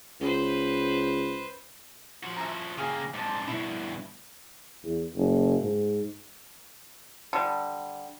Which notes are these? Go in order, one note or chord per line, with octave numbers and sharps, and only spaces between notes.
C#2 B4 C5
F3 F#4
E5 G#5 A#5
C#3 A#3 G4 G#4 F5
G#2 C3 D5 A5
G2 B2 E4 C#6
E2
F#1
G#2
D3 G3